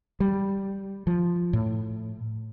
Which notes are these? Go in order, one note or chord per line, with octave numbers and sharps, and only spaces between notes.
G3
F3
A2